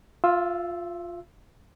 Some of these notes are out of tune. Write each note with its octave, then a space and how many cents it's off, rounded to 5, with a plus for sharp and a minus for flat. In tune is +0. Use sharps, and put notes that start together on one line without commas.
F4 +10 F5 -45 E6 +0